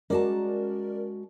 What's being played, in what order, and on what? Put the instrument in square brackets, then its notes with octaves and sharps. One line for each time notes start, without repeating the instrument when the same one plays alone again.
[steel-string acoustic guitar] G#3 F#4 A5 [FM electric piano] C#4 A#4 D5